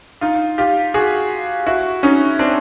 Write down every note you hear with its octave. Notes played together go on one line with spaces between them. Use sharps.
D#4 F4
F4 G4
F#4 G#4
E4 F#4
C#4 D#4
C4 D4